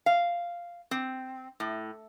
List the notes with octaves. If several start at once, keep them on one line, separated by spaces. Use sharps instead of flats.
F5
C4
A2